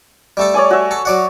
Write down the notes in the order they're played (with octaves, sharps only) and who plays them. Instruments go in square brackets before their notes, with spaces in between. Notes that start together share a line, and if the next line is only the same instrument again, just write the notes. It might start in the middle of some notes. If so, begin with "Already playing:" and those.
[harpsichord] G3 A3 A4
[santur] C#5 D5 G#5
F#4 E5
[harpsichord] A4
F#3 D5 F#5